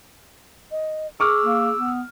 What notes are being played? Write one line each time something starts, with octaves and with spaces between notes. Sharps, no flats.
D#5
G#4 C#6 D6 E6 F6
A#3
B3